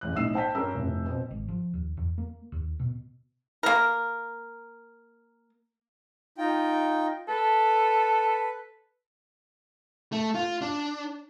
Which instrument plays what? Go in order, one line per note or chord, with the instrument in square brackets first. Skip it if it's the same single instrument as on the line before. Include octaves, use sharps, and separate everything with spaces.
[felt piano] A1 E2 F#6
B1 A2 D#5 E6 C7 E7
C5 G5 A5 G6 B6
G2 C#4 A#4 E6
F1 A2
B2 C4
[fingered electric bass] G#1
F3
D#2
E2
A#3
D#2
B2
[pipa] A#3 A#4
[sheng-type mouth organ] D#4 F4 G5
[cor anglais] A4 [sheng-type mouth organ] B4
[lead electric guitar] A3
F4
D4